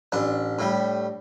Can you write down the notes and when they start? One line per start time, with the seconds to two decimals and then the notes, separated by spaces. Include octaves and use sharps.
0.12 A1 D4
0.59 A2 G3